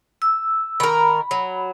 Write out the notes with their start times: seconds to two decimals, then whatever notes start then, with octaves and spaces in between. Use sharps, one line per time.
0.22 E6
0.80 D#3 A#4 B5
1.31 F#3